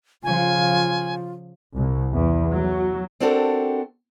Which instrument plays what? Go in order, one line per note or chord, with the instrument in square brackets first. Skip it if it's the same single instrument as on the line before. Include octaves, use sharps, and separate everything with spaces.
[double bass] C#3 F3 [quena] F4 [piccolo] G#5
[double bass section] C2
E2
F#3
[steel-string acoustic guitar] C4 D4 F#4 G4 A4 A#4